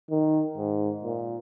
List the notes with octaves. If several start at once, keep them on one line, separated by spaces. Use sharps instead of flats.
D#3
G#2
A#2